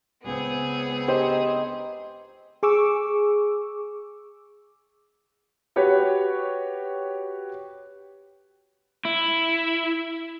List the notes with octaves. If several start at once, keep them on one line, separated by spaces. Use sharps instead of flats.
C#2 B3 C4 G#4
D#4 G4 C5
G#4 C#6 D6 E6
F#4 G4 B4 C#5
E4